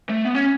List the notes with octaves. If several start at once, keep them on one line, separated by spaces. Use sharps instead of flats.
A3
B3
C#4